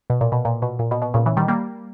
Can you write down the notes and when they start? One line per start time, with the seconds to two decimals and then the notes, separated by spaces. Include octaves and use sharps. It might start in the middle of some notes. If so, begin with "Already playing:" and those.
0.10 B2
0.21 A#2
0.32 B2
0.45 A#2
0.62 B2
0.79 A#2
0.91 B2
1.02 B2
1.14 A#2 C#3
1.26 C#3 E3
1.37 D#3 G3
1.48 G3 A#3